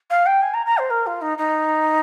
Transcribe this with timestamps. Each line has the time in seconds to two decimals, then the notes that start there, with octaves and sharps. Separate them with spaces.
0.10 F5
0.26 G5
0.42 G#5
0.54 A#5
0.66 A#5
0.78 C5
0.90 A#4
1.06 F4
1.21 D#4
1.38 D#4